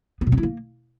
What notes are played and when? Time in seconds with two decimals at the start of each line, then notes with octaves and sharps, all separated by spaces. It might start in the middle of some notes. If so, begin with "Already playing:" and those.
0.21 B3
0.27 B2
0.32 C4
0.38 E4
0.43 A#3